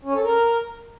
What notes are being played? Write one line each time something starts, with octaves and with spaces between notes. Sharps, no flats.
C#4
A4
A#4